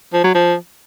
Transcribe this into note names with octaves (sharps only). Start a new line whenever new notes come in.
F3
F#3
F3